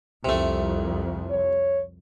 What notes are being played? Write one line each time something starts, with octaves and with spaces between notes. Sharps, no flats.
C2 F2 C3 A3
C#5